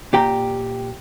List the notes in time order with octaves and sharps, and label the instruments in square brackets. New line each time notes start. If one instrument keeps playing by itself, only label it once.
[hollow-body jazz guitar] A#2 G4 G5 A#5